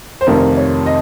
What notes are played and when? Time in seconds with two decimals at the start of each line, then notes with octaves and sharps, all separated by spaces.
0.21 C5
0.27 F1 F2 C3 D#3 A#4
0.57 C#5
0.86 D#5